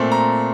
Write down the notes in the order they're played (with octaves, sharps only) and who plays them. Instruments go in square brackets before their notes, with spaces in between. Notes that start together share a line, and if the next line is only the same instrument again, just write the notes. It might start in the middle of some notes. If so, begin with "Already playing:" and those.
Already playing: [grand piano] A#2 A3 C4
A#5